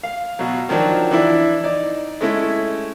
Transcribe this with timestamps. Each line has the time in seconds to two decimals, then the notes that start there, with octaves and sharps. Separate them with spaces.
0.03 F5
0.39 B2 F#3
0.69 D#3 F3 F#3 D4
1.11 E3 D4 E4
1.64 D#4 D5
2.21 G#3 A3 C#4 E4